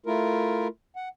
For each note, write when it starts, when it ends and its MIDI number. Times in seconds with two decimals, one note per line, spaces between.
0.06 0.68 57
0.06 0.68 64
0.06 0.68 65
0.06 0.68 70
0.96 1.09 78